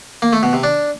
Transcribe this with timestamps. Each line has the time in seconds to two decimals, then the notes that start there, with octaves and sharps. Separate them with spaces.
0.22 A#3
0.33 A3
0.43 B2
0.53 C3
0.63 D4